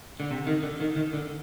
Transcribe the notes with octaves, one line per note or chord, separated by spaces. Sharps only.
D3
C3
D#3
D3
D#3
D#3
D3